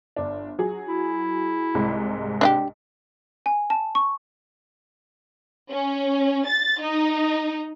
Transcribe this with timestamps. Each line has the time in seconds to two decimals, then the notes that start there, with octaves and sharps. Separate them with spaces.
0.16 G1 D4
0.59 F#3 G#4
0.88 E4
1.75 C2 G#2 G#3
2.41 D4 E4 G4
3.46 G#5
3.70 A5
3.95 C#6
5.70 C#4
6.46 A6
6.81 D#4